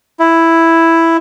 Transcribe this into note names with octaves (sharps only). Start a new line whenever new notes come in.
E4